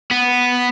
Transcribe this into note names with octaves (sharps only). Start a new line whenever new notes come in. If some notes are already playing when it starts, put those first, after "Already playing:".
B3